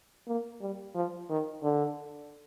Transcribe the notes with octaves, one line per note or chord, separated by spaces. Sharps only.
A#3
G3
F3
D#3
D3